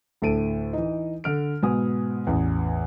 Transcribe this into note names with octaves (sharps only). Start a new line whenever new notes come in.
D2 A2 A4 D7 D#7
E3 D#4
D3 F6 D7
G#2 B2 B3 G#5 D#6
A1 E2